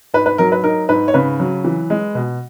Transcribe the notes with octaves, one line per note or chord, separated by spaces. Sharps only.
G#2 B4
B4
F#3 A#4
B4
D#4 A#4
G#2 B4
C#5
C#3 B4
F#3
E3
G#3
B2